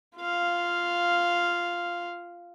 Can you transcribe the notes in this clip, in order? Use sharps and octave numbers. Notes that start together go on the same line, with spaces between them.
F4 F5